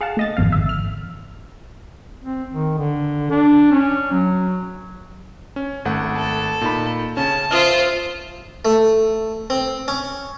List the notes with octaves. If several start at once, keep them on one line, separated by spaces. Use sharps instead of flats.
G#4 F5 F#5 A5
A3 D#5 A6
G#1 F2 F5
G#1 E5
F6
C4
D#3
D3
D4
C#4
F#3
C#4
G#1 A3 F#5
A4
A#2 D#4 B5
C#3 C#4 A5
F4 C5 E5 D#6 F6
A3
C4
C#4